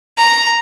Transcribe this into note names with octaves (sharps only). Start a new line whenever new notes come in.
A#5